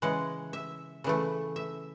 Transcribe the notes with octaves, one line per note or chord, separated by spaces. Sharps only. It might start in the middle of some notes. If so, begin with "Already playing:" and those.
C#3 E3 G#3 F#5
E5
C#3 E3 A3
E5